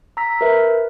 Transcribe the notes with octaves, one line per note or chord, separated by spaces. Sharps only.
A#5 E6 B6
A#4 B4 E5